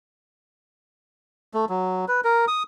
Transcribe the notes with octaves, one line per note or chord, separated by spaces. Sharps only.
A3
F#3
B4
A#4
D#6